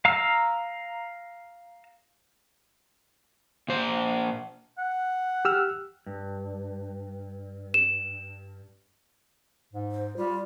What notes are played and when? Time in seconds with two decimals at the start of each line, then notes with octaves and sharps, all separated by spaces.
0.05 F5 A#5 E6 F6
3.68 A#2 C5
4.78 F#5
5.45 G4 E6 F6
6.06 G2
7.74 E7
9.73 G#2
9.92 C5
10.17 G3 F4